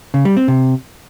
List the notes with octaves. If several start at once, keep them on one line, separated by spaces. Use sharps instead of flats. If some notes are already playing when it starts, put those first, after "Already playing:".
C#3
G3
C4
C3